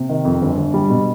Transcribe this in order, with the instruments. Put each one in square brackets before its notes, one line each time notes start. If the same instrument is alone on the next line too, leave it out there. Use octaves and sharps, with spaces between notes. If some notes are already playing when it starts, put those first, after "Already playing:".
Already playing: [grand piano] C3
D#3
F2
G1
G1
G3
B2